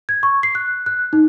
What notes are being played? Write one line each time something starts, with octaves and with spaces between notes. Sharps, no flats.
G#6
C#6
C7
F#6
F#6
D#4